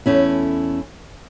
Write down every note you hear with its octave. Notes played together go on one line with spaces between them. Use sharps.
E2 A3 C#4 E4